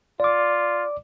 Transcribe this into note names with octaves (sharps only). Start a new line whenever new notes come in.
F4 D5 D6